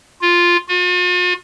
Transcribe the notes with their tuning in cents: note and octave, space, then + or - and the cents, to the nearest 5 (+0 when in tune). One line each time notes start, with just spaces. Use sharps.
F4 +0
F4 +45